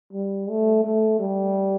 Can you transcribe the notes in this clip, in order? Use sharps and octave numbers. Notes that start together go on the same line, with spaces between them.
G3
A3
A3
G3